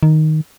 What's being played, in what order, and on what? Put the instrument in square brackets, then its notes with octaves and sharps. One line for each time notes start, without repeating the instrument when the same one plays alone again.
[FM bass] D#3